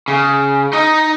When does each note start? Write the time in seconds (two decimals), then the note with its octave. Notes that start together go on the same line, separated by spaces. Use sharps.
0.08 C#3
0.73 D#4 D#5